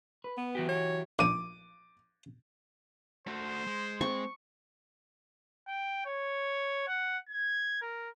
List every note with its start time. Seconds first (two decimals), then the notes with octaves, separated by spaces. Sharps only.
0.24 B4
0.37 B3
0.55 E3 F#4 G4
0.69 C#5
1.19 A#1 D6 D#7
3.27 A3 F#4 C5
3.67 G#3
4.01 C4 C#6
5.68 G5
6.06 C#5
6.88 F#5
7.30 G#6
7.82 A#4